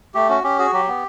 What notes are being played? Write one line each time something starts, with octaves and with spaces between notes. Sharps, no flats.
A3 G4
C#4 F#4
C#4 G4
F#4 G#4
F#3 G4
B3